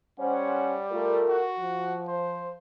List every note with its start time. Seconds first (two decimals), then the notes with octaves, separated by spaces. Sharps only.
0.19 G3 C#4 C5 F#5
0.91 A3 F4 A#4
1.28 F#4
1.59 F3
2.08 C5